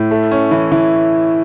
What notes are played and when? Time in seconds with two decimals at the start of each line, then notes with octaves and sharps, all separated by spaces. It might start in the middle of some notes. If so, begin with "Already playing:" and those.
Already playing: A2
0.11 A3
0.31 C#4
0.51 E3
0.72 E3